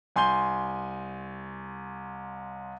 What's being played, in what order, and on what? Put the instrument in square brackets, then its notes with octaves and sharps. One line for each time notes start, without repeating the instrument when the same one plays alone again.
[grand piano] C2 G#5 C6 G6 G7